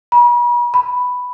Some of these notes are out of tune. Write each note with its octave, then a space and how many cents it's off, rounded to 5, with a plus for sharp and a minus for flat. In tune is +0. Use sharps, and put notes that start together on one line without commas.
B5 -40
B5 +5